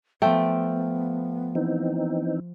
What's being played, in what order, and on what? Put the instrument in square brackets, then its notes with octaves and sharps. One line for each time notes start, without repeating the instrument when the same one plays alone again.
[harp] F3 G5 [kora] A3 [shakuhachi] B3
[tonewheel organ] E3 C4 D#4